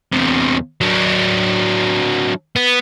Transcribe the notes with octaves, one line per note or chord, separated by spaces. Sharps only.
E2 C3
F#3 D4
B3